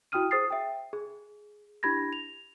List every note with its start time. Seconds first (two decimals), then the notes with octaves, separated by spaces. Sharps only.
0.12 E4 F#4 G5 D#6 F6 D#7
0.31 G#4 C5 D#6 A6 C7
0.50 E5 G5
0.93 G#4
1.83 D4 E4 G4 B5 G#6 A#6
2.13 F7